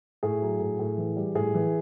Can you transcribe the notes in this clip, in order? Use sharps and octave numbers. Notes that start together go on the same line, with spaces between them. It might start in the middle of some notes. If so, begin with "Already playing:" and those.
A2 G#4
F#3
A2
A2
E3
G3
A2 G#4
E3